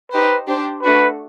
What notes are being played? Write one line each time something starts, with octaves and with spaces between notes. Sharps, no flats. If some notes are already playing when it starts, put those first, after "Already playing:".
D#4 G4 B4 C5
D4 G4 C5
A3 D4 F#4 B4